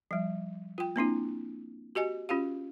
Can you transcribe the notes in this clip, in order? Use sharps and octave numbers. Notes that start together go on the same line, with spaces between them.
F3 G3
F4 G5
A#3 C4 D4 E4
F#4 G4 D#5 G#5
C#4 F4 G4 F5